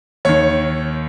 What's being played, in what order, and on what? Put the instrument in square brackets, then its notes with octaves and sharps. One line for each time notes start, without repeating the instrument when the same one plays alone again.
[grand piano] D#2 D#3 C#5